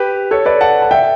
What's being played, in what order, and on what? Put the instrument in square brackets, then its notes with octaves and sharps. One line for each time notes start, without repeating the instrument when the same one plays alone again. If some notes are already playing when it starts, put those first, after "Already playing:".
Already playing: [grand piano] G4 B4
A4 C#5
B4 D5
F#5 A5
A5
E5 G5